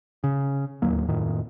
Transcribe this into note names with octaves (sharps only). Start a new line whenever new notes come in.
C#3
D1 D#2 F#3 A#3
F2 A2 D#3